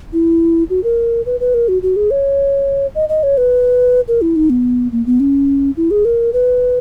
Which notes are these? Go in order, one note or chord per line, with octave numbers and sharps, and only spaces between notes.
E4
F#4
A#4
B4
B4
A#4
F#4
F#4
G#4
C#5
D#5
D#5
C#5
B4
A#4
E4
D#4
B3
A#3
B3
C#4
E4
G#4
A#4
B4